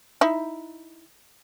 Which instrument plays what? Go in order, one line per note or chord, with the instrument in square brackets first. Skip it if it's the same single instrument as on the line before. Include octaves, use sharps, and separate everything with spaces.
[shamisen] D#4 E4